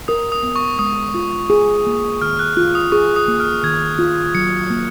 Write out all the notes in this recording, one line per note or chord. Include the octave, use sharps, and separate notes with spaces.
A#4 D#6
D#6
B3
C#6
G#3 D#6
F4
G#4
A#3
D#3 F6
F#6
F4 F#6
D#6
G#4 C#6
D#6
A#3
F6
D#3 G#6
F4
F#3 C#7
A#3